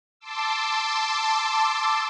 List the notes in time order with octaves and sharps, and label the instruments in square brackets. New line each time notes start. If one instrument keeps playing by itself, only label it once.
[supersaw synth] A5 C6 D6 E6